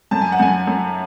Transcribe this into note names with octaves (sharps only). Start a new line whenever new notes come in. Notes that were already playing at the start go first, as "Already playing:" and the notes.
F#2 A5
G#5
F#5
F#2 G#5
F#2